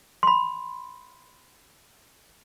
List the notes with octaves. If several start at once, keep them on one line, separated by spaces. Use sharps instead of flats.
B5 C6